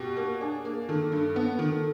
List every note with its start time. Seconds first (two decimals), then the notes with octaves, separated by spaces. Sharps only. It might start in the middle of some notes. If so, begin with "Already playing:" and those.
Already playing: B2 G4
0.17 A#3
0.41 D4 G#4
0.65 A#3
0.88 D#3 A4
1.12 G2
1.36 B3
1.59 D#3